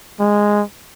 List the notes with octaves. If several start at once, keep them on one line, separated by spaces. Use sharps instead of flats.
G#3